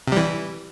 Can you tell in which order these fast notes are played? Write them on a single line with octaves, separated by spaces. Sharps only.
C3 G3 E3